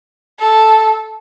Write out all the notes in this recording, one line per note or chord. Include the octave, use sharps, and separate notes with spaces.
A4